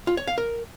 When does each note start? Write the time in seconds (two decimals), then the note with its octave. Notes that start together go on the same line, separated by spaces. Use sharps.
0.07 F4
0.17 C#5
0.27 F5
0.38 A#4